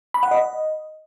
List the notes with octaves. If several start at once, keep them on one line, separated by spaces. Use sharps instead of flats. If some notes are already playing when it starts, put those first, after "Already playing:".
B5
F#5
D#5